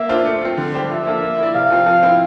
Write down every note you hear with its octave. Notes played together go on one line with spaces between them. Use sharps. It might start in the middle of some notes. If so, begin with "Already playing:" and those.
Already playing: A#3 E5
D4 F4 C5
A3
C4 F4
D3
G3 D4 G4 C5
F3 E5
A#3 D4 F4 A4
A#3
E4 A#4 D5
C3 F5
F3 C4
F3
C4 E4